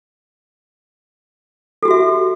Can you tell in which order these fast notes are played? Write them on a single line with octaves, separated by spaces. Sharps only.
A4 G4 F#4 E5